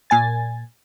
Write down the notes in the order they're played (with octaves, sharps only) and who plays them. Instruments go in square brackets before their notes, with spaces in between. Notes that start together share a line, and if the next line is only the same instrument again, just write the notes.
[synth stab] A#2 G#5 A6